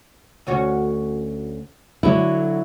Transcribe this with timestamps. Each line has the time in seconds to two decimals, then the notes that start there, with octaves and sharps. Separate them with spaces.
0.47 D2 C#4 F#4
2.03 D3 F#3 E4